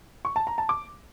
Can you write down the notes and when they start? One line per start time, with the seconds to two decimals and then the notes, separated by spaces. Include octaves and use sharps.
0.25 C#6
0.36 A5
0.47 A#5
0.58 A5
0.69 D6